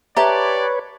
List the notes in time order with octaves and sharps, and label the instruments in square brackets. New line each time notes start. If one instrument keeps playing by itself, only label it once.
[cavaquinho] G4 A5 [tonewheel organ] B4 C#5 [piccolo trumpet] D5 [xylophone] E5 A#5